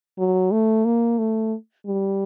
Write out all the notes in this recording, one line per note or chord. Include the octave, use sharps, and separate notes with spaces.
F#3
A3
A#3
A3
G3